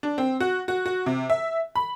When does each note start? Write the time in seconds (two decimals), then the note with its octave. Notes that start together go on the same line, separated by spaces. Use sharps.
0.03 D4
0.18 C4
0.40 F#4
0.68 F#4
0.86 F#4
1.06 C3
1.30 E5
1.76 B5